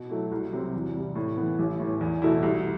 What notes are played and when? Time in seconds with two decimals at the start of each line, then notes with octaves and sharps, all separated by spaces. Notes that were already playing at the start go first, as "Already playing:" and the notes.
Already playing: B2
0.10 F#3 A3 E4
0.32 C2
0.53 C3 F#3 C4
0.74 E2
0.95 C3 G3
1.15 A2
1.37 E3 B3
1.59 A1
1.80 A2 E3
2.01 E2
2.22 B2 A3 E4
2.43 C2